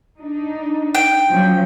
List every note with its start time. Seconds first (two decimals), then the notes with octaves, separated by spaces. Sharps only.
0.20 D4 D#4
0.95 G5
1.30 F3 F#3 C#4